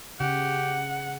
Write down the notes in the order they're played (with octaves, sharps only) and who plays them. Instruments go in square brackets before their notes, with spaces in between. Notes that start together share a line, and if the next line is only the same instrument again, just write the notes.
[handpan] C#3 [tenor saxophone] G4 [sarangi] F#5